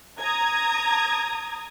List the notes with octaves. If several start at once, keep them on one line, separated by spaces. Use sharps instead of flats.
A#5 D#6 G#6